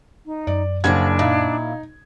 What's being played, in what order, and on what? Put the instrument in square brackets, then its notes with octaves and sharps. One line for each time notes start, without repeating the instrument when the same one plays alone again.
[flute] D#4
[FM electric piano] F#2 [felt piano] D5
[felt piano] F#1 G#6 [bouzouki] F3 G3 F#4 [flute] D4
[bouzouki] A#2 E4 [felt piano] D#4